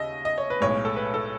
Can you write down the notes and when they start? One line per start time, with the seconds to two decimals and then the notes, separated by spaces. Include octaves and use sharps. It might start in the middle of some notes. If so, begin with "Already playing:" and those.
Already playing: D#2 C#3 D#5 E5
0.25 D#5
0.38 C#5
0.50 B4
0.60 B1 A2 G#3 C#5
0.85 A4
0.96 B4
1.14 A4